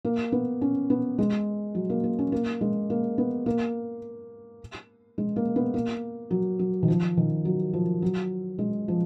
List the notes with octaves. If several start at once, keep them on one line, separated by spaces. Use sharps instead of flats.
A#3
B3
C#4
B3
G#3
F#3
A#3
A#3
C#4
A#3
G#3
A#3
B3
A#3
G#3
A#3
B3
A#3
F#3
F#3
D#3
F3
D#3
F#3
F3
F#3
G#3
F3